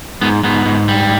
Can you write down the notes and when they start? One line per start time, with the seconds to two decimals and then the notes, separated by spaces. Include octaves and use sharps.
0.21 G#2 B3
0.43 G#2 B3
0.66 G#2
0.88 G3